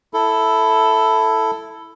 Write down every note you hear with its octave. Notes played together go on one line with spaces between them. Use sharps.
E4 A4